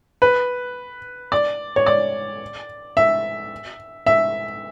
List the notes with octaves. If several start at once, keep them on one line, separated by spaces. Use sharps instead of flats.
B4
D5
C#5
D5
E5
E5